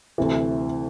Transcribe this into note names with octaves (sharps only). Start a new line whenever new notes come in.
D2 C3 E3